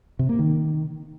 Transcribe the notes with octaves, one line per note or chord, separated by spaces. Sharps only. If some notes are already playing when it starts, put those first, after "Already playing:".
C3
A#3
D#3